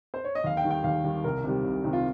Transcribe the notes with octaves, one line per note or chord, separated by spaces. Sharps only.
C5
C#5
D#5
D#2 F5
G5
D#3 G3
G5
D#2 F5
D#3 G3
C2 A#4
C3 D#3 G3
C2
C3 D#3 G3
F4